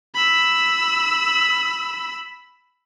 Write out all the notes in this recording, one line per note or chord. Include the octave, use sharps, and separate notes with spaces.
B5 E6